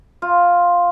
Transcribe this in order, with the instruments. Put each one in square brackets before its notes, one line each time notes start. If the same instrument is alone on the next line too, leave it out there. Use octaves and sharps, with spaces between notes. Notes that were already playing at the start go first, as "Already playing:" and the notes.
[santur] F4